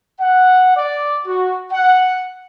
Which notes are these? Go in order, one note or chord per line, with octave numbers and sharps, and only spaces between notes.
F#5
D5
F#4
F#5